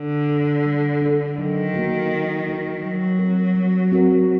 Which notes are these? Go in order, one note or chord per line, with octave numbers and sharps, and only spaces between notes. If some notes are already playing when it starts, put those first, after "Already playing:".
Already playing: D3
D4 A4
G3
D4 A4
D#3 F#3
A#3 F#4 A#4
F#3
A#3 F#4 A#4
F#3 G3
C4 F#4 A#4
G3
C4 F#4 A#4